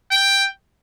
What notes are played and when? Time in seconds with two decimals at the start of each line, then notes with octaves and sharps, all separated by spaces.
0.11 G5